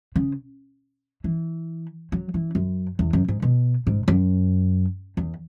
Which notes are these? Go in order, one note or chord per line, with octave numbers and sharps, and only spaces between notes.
C#3
E3
F#3
E3
F#2
E2
F#2
G#2
B2
G#2
F#2
E2